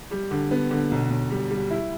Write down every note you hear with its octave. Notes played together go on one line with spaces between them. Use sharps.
G3
D3
B3
D3
B1
B1
G3
G3
E4